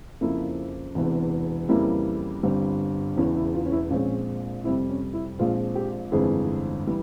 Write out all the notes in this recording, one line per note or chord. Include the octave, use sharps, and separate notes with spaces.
F2 C#3 F3 A#3 E4
E1 E2 C3 E3
F2 C#3 E3 G3 A#3 E4
G1 G2 G3 C4
E1 E2 C#3 E3 C#4
E4
F4
C#4
E4
A#1 A#2 G#3 C4 C#4
F2 C3 G3 E4
C#4
E4
A#1 A#2 F3 G#3 C4 F4
G4
G1 F2 E3 G#3 C4 G#4
E3 G3